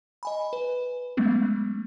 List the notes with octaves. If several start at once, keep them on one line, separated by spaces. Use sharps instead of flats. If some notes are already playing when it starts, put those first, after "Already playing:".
D#5 G#5 B5
B4
F#3 G#3 A3 B3 C#4